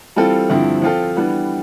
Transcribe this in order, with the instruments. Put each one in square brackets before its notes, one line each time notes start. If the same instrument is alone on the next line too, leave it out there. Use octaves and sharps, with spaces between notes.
[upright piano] E3 G3 C4 F4 A4
G2 D3 F3 C4 E4
F3 C4 F4 A4
E3 G3 B3 D4